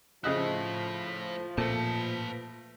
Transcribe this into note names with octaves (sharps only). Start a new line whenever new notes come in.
C#3 F3 A3 E4 D#5 F#6
A#2 A3 B4 A5